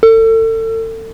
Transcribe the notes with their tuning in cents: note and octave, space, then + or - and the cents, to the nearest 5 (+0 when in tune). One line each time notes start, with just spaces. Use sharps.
A4 +35